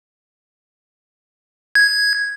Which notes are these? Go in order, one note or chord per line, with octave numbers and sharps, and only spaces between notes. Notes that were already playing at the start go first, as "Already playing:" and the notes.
G#6